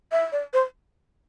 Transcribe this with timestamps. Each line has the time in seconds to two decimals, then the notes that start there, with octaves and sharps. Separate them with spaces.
0.12 E5
0.32 D5
0.53 C5